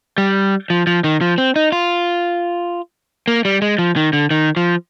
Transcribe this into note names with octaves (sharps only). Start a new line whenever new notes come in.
G3
F3
F3
D#3
F3
C4
D#4
F4
A#3
G3
G#3
F3
D#3
D3
D#3
F3